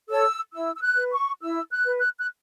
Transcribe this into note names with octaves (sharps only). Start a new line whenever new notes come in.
A4 C#5 E6
E4 E6
E6
F#6
B4
C#6
E4 E6
F#6
B4
F#6
F#6